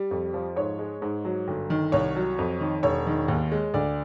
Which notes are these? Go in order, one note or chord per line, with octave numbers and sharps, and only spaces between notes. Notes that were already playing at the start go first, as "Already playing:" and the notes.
Already playing: G3 D5
F2
F3
G#2 C#5
G#3
G#2
F#3
G1
D#3
C2 C#5
F#3
F2
D#3
E1 C#5
D#3
D#2
G#3
D2 D5